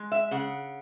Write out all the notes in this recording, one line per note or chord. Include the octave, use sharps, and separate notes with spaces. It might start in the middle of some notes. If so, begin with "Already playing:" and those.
Already playing: G#3
E5
C#3 F#5